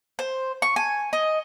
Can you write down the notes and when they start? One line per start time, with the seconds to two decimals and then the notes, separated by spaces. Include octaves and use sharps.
0.19 C5
0.62 C#6
0.76 G#5
1.13 D#5